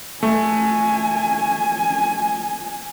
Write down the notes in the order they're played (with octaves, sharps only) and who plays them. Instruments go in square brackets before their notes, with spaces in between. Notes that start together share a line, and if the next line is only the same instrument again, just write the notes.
[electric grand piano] A3 [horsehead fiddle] G#5